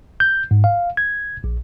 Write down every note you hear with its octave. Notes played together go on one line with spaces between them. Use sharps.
G6
G#2
F5
G#6
A#1